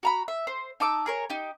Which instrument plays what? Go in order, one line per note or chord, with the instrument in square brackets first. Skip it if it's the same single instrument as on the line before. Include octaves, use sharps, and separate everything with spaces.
[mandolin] F#4 A#5 B5
E5
C5
D#4 A5 D6 E6
G#4 A#4 C#5
D#4 G4